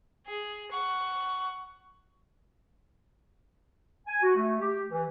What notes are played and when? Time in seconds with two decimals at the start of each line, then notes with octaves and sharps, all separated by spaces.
0.26 G#4
0.72 F#5 C#6
4.07 G#5
4.22 F#4
4.36 A3
4.60 G4
4.90 E3